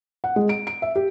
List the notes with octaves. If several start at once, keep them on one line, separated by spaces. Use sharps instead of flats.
F#5
G#3
D7
D7
E5
G4